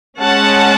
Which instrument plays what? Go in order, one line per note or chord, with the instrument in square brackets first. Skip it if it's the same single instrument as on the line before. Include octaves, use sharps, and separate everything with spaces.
[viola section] G#3 C#4 F#5 A5